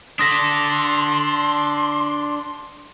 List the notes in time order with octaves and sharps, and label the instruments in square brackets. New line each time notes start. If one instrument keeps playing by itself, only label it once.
[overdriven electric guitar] D4 A4 [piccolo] C6 [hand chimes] D#6 A#6 B6